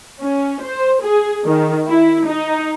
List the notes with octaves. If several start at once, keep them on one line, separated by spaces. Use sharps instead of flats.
C#4
C5
G#4
D#3
E4
D#4